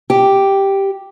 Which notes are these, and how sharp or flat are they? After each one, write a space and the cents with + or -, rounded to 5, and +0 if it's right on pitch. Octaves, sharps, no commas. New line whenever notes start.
G4 +0